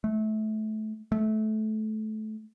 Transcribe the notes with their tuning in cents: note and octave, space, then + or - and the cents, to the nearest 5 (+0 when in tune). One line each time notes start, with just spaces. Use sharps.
A3 -25
A3 -20